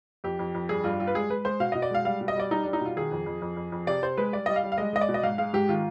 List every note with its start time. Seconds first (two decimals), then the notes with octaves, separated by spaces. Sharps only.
0.24 F2 G4
0.39 F2
0.55 F2
0.69 G2 G#4
0.84 G2 F4
0.99 G3 F4
1.07 B4
1.15 G#3 G#4
1.30 G#3 B4
1.45 G#3 C5
1.60 B2 F5
1.72 B2 D#5
1.82 D5
1.91 G#3 F5
2.05 G3 F5
2.21 B2
2.28 D#5
2.36 G3 D5
2.51 G3 D#4
2.63 G3 D4
2.73 D#4
2.81 B2 F4
2.96 D#3 G#4
3.12 F2
3.26 F2
3.42 F2
3.57 F2
3.72 F2
3.87 C3 D5
4.02 C3 C5
4.17 G#3 B4
4.33 G3 D5
4.46 G3 D#5
4.56 F5
4.63 G3
4.72 F5
4.78 G#3 D#5
4.93 G#3 D#5
5.01 D5
5.09 B2
5.14 D#5
5.23 G#2 F5
5.38 G#3 F5
5.53 G#2 G4
5.69 D#3 F4